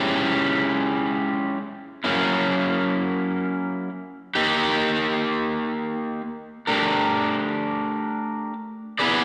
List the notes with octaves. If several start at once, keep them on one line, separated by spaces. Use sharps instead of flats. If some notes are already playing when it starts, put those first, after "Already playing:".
Already playing: G#3 C#4 E4 G4
F#3 A#3 C#4 E4
A#3 D#4 G4
A3 D4 G4 A#4
B3 E4 G#4 B4 D5